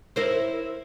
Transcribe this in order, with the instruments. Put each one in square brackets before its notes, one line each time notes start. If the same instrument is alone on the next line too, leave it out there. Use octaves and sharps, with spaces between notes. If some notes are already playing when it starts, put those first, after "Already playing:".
[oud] E4 A#4 C5